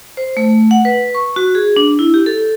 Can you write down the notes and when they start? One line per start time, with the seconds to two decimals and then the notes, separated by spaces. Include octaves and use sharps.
0.17 C5
0.37 A3
0.71 F#5
0.85 B4
1.15 C#6
1.36 F#4
1.55 G#4
1.76 D4
1.99 E4
2.14 G4
2.26 A4